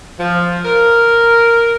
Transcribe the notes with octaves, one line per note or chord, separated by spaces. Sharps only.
F3
A#4